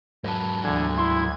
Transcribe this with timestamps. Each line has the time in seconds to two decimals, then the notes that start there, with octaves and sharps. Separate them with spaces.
0.24 G#2 F#3 A#4 B4 A5
0.64 D2 D3 E3 G#6
0.97 E4 C6